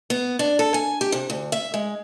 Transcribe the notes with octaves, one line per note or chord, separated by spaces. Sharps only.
B3
D4
A4
G#5
G4
C3
D2
E5
G#3